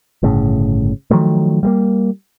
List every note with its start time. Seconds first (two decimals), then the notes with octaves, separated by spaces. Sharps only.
0.23 G1 A2 C#3
1.11 D#3 F3 F#3 A3
1.63 G3 G#3 A#3